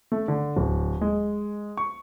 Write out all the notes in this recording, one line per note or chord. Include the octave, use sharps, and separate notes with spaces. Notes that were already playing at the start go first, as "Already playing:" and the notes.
A3
D3
D1
G#3
C#6